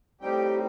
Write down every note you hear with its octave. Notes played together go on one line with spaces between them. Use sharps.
A2 G3 C4 D#4 G4 G5